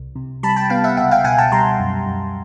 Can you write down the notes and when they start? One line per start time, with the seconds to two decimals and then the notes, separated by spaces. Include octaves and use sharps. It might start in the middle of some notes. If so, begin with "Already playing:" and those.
Already playing: C2
0.15 C3
0.43 G3 A5 B5
0.56 G5 A5
0.70 B3 F5 G5
0.84 E5 F#5
0.97 C#2 E5 F#5
1.11 F5 G5
1.24 B2 F#5 G#5
1.38 G5 A5
1.52 G3 A#5 C6
1.80 F#2
2.06 F#2